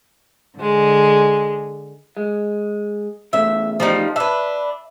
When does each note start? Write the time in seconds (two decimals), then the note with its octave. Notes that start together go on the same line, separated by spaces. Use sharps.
0.57 D3 G#3
2.17 G#3
3.33 E2 C#3 A3 E5
3.80 F3 G3 D#4
4.16 D4 B4 E5